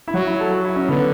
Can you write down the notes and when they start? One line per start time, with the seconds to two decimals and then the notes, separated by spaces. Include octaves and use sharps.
0.08 E4
0.14 F#3 F#4
0.27 E4
0.39 A4
0.52 F#4
0.64 E4
0.76 C#4
0.88 D3 B3